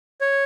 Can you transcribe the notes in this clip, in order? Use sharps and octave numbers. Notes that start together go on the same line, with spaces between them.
C#5